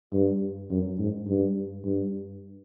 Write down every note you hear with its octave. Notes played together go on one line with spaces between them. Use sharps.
G2
F#2
G#2
G2
G2